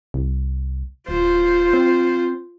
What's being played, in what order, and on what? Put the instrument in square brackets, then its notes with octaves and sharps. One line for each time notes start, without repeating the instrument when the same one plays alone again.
[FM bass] C2
[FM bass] D1 [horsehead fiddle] F4 C5
[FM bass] C4